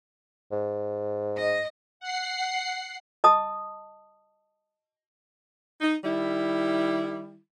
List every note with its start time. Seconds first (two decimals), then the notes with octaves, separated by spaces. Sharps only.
0.52 G#2
1.37 D#5
2.00 F#5 C7
3.24 D#5 A5 D#6
5.81 D#4
6.04 D#3 G3 E4